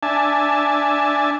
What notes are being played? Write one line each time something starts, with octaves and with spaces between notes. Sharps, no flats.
D4 E5 G#5 A5